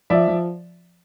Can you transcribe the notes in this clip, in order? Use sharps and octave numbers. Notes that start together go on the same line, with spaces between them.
F3 D5 E5
F3